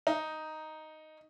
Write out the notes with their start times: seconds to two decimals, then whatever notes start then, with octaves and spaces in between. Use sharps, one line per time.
0.07 D#4